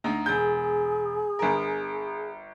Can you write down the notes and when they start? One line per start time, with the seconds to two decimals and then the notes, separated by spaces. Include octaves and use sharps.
0.04 D2 D#4 A#5
0.26 E1 G#4 G6
1.39 G1 A#4